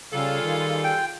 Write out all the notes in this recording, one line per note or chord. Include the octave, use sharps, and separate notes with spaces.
C#3 G3 F4 G#4 A4
D#3
G5